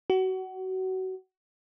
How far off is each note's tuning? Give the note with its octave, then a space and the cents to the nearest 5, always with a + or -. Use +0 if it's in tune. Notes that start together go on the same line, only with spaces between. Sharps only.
F#4 +25